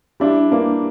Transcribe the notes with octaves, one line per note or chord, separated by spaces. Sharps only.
G3 D4 E4
A#3 D4